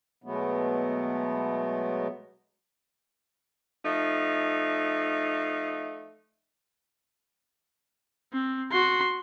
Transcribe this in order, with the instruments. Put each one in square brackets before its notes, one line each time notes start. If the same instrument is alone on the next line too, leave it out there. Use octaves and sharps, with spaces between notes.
[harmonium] B2 F#3 G#3 A3 B3
[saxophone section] F3 A3 D#4
[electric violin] C4
F#4 C6